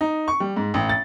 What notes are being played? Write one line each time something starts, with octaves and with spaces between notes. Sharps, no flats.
D#4
C#6
G3
G#2
A1
A6